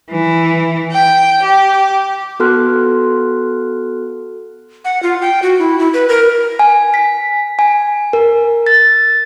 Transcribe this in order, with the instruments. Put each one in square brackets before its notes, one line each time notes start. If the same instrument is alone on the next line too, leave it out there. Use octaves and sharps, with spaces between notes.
[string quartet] E3
G5
G4
[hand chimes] B3 F#4 A4 C6 F6 F#6
[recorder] F#5
F4
G5
F#4
E4
E4
B4
A#4
[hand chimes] G#5
B6
G#5
A#4
A6